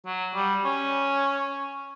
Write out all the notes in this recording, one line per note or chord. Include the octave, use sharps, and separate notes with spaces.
F#3
G3
C#4